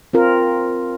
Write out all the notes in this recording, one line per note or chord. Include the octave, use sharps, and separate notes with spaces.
C4 F4 A#4